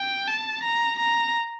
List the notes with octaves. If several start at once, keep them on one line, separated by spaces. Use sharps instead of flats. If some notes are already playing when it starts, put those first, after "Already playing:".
Already playing: G5
A5
A#5
A#5